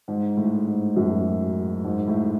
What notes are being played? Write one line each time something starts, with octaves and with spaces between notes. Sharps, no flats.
G#2
A2
G#2
F#2
G#2
A2